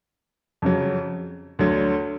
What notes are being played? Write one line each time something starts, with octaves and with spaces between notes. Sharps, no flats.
F2 C#3 F#3
D2 D3 F#3